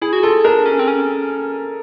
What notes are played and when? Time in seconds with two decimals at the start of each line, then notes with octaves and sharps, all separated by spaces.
0.02 E4 G#4
0.13 F#4
0.23 F4 A4
0.44 D4 A#4
0.66 C#4
0.79 C4
0.87 C#4